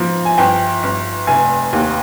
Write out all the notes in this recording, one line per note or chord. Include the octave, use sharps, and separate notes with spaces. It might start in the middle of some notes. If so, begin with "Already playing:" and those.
Already playing: G#2 F3
G#5
G1 G5
G1
F1 G#5
D#2